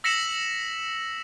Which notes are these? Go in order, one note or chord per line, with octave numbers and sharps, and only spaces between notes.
E6 A#6 B6 C#7 E7 F#7